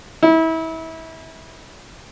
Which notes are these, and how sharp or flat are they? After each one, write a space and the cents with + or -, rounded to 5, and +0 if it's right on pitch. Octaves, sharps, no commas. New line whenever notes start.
E4 -30